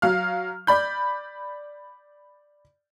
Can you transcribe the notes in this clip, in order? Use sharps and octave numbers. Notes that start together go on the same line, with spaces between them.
F#3 F5 F6
D5 B5 G6